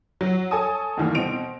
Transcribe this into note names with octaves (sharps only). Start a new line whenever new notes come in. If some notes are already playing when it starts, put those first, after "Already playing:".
F#3
A4 C#5 G#5 A5 D#6
D2 G2 D#3 E3 A#3
B2 C4 D7 F7